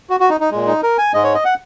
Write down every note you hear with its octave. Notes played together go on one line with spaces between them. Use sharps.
F#4
F#4
D#4
D#4
A#2 G#3
D#4
A#4
G#5
G#2 G#3 D#5
C#5
D#5
F#5